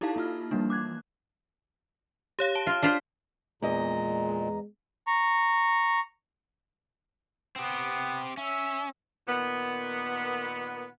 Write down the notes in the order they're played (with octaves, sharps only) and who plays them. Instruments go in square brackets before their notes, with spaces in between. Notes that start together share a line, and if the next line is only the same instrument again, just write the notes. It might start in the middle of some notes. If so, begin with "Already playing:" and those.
[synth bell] D#4 E4 G4 A4 F5 A5
A#3 F4 F6
E3 F3 G3 A#3 D4
D6 F#6 G#6
G4 C#5 F5
A5 G7
[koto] F4
[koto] D4 F4 C5 [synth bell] F6 B6 C7
[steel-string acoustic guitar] E2 D#5 [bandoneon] A#2 [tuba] G#3 [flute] A#5
[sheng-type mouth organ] A#5 C#6
[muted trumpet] B3 [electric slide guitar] C4 G4
[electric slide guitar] C#4 [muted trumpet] E5
[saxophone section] A#2 D#3 B3